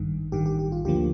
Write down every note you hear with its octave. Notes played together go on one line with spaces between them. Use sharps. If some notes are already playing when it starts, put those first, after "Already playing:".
Already playing: A1 G2 D#3
A1 G2 D#3 G4
G4
G4
F4
D2 D3 F3 A#3 G4